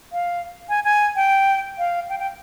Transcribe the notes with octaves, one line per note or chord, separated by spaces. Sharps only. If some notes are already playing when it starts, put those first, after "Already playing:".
F5
G#5
G#5
G5
F5
G5
G5